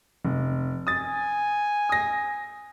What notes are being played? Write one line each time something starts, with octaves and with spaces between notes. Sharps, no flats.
F1
G#5 D#6 A6
D#6 A#6